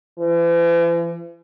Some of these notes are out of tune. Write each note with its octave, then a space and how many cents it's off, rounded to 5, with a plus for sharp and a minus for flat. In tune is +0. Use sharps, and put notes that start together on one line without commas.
E3 +45